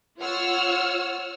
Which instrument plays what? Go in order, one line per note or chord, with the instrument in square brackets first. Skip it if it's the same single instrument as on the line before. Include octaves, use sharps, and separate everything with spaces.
[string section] F4 C#5 F#5 E6 F6